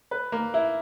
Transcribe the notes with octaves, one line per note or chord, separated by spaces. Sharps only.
B4
A#3
E4